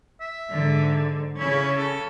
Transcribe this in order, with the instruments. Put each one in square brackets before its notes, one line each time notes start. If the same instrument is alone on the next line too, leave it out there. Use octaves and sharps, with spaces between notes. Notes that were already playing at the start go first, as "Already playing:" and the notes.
[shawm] E5
[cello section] G#2 D3
[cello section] C#3 C#4 [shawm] E4
[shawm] A4